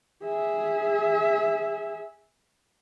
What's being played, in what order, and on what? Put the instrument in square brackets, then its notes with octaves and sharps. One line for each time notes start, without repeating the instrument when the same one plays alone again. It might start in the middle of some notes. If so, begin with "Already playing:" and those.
[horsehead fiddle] G#4 E5